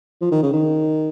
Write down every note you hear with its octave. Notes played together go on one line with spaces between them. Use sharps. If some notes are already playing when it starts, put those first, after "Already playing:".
F3
D#3
C#3
D#3